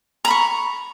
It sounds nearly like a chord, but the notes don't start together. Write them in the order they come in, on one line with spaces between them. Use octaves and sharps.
A#5 B5 C#6